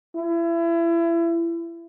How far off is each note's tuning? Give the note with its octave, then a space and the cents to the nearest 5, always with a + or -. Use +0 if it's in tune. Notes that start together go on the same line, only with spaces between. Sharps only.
E4 +30